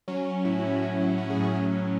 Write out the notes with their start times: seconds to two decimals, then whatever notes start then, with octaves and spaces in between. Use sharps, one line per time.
0.08 F#3 C#4
0.26 F#3
0.45 A2 E4
0.59 A2 F#4
0.72 E4
0.82 F#3
1.00 F#3
1.08 E4
1.18 A2 F#4
1.30 G#4
1.36 A2
1.43 F#4
1.55 F#3 C#4
1.74 F#3